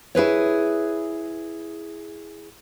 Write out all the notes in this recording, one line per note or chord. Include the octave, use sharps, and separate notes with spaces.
E4 G#4 B4 C#5